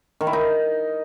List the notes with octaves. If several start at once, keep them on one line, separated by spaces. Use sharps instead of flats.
D#3
E4
D#4